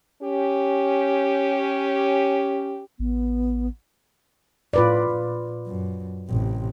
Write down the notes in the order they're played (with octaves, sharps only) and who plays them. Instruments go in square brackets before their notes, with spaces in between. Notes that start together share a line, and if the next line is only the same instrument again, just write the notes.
[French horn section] C#4 G4
[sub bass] A1 [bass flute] B3
[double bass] A2 [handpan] F4 B4 D5
[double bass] A#2
F#2
A1 C3